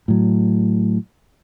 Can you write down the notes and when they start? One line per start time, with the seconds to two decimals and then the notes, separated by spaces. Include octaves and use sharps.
0.08 A2 F#3